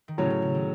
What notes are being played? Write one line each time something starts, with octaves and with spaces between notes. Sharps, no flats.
D#3
A2 C#3 F#3 C#4
C#3
C#3
D#3